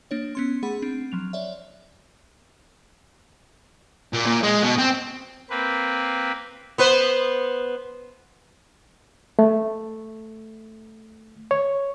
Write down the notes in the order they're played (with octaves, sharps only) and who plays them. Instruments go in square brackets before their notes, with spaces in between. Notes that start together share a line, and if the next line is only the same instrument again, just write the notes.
[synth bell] A#3 D4 C#5
B3 C#4 C6
A3 G#4 F#5 B5
C4 D4
F3 F#3 F7
C#5 D5 E5
[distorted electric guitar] A#2
A#2
G#3
B2
C4
[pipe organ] A#3 C4 B4
[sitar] B3 B4 C5
[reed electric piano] A3
C#5